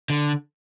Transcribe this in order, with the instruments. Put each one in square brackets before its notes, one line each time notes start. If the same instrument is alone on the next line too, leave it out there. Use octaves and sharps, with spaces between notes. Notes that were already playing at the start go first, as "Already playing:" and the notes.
[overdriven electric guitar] D3